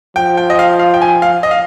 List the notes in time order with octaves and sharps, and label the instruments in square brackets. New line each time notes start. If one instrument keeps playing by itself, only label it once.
[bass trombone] F3 [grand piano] G5
[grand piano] G5
D#5
F5
F5
G5
G#5
F5
D#5
F5